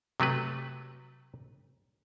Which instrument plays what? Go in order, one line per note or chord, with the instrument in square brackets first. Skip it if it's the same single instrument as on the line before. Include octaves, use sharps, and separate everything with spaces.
[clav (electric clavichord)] C3 F#3 A3 B4